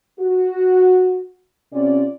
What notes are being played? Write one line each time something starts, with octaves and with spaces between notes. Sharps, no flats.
F#4
C3 C#4 F4 D5